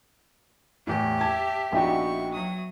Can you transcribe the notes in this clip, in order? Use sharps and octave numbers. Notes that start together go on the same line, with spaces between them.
E2 A2 G4
E5 A5 G#6
A#1 B3 D#4 F#4 E5 G5 C#6
F#3 D#6